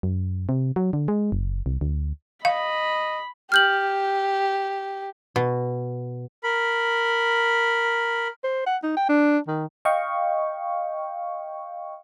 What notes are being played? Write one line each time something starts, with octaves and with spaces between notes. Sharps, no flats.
F#2
C3
F#3
D3
G#3
F#1
C2
D2
D#5 F5 B5
G4 F6 G6 F#7
B2
A#4 B5
C5
F#5
D#4
G5
D4
D#3
D#5 F5 G5 C#6